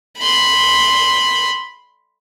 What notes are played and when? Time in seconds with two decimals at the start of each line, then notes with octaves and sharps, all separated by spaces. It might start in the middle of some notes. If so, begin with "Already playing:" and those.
0.19 B5 C6